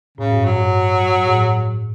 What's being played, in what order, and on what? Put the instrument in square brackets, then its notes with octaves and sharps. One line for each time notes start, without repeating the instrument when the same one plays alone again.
[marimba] A2 [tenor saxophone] C#3
[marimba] G2
[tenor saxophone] F#3
[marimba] G2
A2